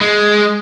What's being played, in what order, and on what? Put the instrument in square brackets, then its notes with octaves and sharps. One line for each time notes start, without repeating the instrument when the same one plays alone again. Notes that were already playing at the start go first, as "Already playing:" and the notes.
[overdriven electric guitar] G#3